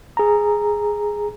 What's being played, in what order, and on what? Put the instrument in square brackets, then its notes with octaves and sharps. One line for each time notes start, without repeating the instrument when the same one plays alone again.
[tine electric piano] G#4 A#5